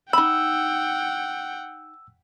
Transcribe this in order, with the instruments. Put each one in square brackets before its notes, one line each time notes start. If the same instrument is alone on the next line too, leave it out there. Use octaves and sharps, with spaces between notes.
[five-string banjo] D#4 B5 [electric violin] F#5 G5 [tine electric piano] E6